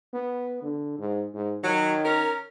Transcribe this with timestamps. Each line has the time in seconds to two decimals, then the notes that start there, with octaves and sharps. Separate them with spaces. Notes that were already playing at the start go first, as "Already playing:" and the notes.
0.13 B3
0.62 D3
0.99 G#2
1.34 G#2
1.64 D#3 F#3
2.05 C#4 A#4